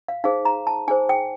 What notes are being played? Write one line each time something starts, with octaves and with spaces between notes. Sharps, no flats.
F5
D#4 G#4 C5 F5
A#5
A5
D#4 G#4 C5 G#5
G5